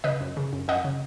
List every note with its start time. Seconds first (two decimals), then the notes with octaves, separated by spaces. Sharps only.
0.04 C#3 B4 D#5
0.21 F#2
0.37 C#3
0.53 F#2
0.68 F#2 D#5 F#5
0.84 C#3